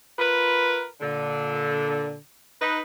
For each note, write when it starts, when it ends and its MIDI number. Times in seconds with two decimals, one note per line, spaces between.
0.19 0.88 65
0.19 0.88 70
0.19 0.88 71
1.01 2.17 46
1.01 2.17 50
2.62 2.82 63
2.62 2.82 71